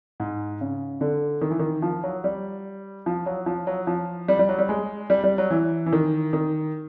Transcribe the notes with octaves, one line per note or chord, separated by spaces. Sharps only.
G#2
C#3
D3
D#3
E3
D#3
F3
F#3
G3
F3
F#3
F3
F#3
F3
G3
G3
F#3
G3
G#3
G3
G3
F#3
E3
E3
D#3
D#3